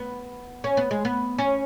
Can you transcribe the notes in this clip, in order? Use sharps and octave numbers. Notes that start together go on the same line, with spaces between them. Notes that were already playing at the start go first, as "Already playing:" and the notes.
Already playing: B3
C#4
B3
G#3
B3
C#4